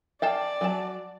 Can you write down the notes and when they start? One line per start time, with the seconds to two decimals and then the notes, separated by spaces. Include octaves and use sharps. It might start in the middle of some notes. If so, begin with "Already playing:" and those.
0.22 D5 F5 G5 A5
0.61 F#3 A5